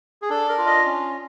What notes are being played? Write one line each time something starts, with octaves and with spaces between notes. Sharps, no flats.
G#4
D4 A4
A#4
F4
D#5
C#4